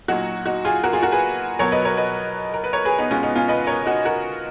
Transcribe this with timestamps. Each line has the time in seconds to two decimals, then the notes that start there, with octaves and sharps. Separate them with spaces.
0.08 A#2 F#3 D#4 F#4
0.46 D#4 F#4
0.65 F4 G#4
0.84 F#4 A#4
0.93 F4 G#4
1.03 F#4 A#4
1.12 G#4 B4
1.59 B2 F#3 A#4 C#5
1.72 B4 D#5
1.85 A#4 C#5
1.97 B4 D#5
2.54 A#4
2.64 B4
2.73 A#4 C#5
2.85 G#4 B4
2.99 B3 D#4
3.11 B2 G#3 C#4 F4
3.23 B3 D#4
3.35 C#4 F4
3.48 B4 D#5
3.67 A#4 C#5
3.86 D#4 F#4
4.05 F#4 A#4